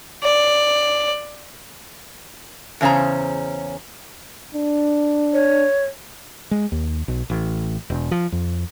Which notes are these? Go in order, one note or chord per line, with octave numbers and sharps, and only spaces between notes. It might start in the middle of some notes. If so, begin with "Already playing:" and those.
D5
E2 C#3 C#4 C5 A#5
D4
C#5
G#3
D#2
B1
A1
E1
F3
F2